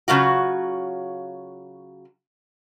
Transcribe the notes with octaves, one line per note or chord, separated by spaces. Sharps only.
C#3 F#3 F4 F#4